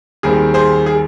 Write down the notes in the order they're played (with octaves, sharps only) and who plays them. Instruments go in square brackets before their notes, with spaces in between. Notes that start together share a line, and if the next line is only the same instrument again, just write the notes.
[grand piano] D#2 D#3 G3 C4 G#4
G#4 C5
G#4